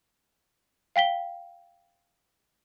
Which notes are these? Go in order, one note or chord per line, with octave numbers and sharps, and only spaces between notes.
F5 G5 B6 G7